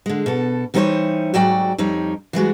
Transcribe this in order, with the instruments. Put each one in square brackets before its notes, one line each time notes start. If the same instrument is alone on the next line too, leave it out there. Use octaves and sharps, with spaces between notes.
[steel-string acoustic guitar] D3 G#3
B2 A4
E3 G3 D#4 A4 C5 C#5
G#2 F#3 F#4 D5 G5
F2 G3 D#4 C#5
E3 G3 G#3 F#4